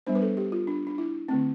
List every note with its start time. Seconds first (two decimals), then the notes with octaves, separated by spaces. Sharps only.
0.07 G3 B3 D4 C5
0.15 B4
0.22 A4
0.37 G4
0.52 F4
0.67 D4
0.87 D4
0.98 E4
1.28 D3 A3 C4